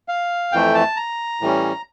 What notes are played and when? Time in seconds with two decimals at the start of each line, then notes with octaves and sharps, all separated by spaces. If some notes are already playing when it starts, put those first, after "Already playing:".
0.08 F5
0.52 F2 E3 A3 G5
0.75 A5
0.97 A#5
1.41 A2 E3 G3 C#4